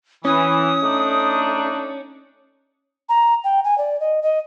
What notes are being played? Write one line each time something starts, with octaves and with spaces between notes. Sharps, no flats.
E3 C#4 D#6
A3 D4 D#4
A#5
G5
G#5
D5
D#5
D#5